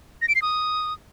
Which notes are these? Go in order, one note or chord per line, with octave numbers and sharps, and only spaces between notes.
A#6
D7
C7
D#6